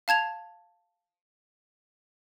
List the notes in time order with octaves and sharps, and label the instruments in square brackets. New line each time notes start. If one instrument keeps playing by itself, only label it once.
[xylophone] F5 A5 G#6 F7